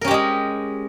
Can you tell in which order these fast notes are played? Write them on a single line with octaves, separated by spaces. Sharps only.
A#4 C#4 G4 G#3 G#4